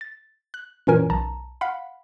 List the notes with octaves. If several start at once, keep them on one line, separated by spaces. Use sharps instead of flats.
A6
F#6
F#2 A#2 E3 C#4 A#4 G#5
B1 A5 A#5
F5 F#5 B5